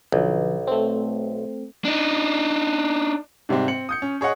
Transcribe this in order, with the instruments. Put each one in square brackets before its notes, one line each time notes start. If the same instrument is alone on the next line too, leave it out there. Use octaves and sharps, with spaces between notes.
[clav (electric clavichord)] B1 [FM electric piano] D3 F3
[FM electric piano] A3 C4
[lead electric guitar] D4 D#4
[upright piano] G#2 C3 G3 C4
C4 C#7 F#7
D#6 G6 C#7
C#4
G#4 C#5 D#5 F#5